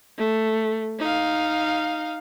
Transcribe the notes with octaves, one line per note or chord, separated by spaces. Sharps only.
A3
D#4 F5